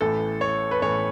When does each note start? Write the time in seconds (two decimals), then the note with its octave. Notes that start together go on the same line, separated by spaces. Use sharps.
0.01 A1 A2 E3 A4
0.41 C#5
0.71 B4
0.82 A1 A2 E3 C#5